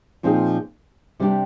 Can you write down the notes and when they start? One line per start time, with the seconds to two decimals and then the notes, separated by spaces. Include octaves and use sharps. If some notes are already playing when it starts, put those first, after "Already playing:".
0.23 A#2 F3 C4 D#4 G#4
1.20 C3 G3 D4 G4